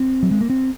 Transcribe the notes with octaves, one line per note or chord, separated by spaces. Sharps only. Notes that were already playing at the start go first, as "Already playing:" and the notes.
Already playing: C4
F#3
G#3
A#3
C4